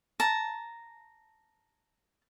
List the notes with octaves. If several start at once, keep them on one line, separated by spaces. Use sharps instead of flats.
A5 A#5